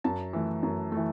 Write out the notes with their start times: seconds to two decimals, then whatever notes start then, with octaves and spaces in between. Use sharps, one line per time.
0.04 F#2 A5
0.33 E3 A3
0.63 F#2
0.92 E3 A3